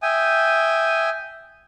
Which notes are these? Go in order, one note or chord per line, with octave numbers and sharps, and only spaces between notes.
E5 G5 G#5 D#6